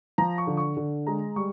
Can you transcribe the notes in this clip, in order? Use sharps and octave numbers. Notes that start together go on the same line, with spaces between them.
F3 A#5
C#6
D3
C#6
D3
G#3 A#5
G3 C#6